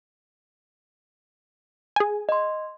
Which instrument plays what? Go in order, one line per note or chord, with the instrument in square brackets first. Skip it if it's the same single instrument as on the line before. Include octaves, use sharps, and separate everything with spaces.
[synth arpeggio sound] G#4 G#5
[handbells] D#5 C6